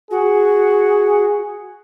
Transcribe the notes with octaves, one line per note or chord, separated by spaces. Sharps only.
F#4 G#4